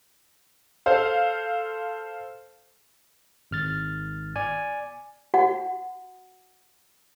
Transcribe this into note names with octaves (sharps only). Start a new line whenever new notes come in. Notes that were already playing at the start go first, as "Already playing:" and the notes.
A4 C5 F5
G#1 F6 A6
D5 G#5
F#4 F#5